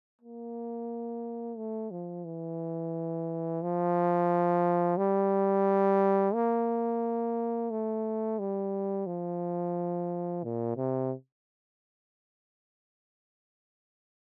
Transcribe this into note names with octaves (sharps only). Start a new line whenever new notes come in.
A#3
A3
F3
E3
F3
G3
A#3
A3
G3
F3
A#2
C3